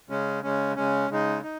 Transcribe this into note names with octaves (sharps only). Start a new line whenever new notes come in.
C#3 G#3 C#4
C#3 G#3 C#4
C#3 G#3 C#4
C#3 G#3 D#4
D#4